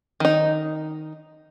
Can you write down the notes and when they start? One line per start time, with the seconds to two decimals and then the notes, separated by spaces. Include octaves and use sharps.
0.20 D#3 D#4